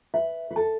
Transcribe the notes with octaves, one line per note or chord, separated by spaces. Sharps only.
B4 E5
B4
A4 A5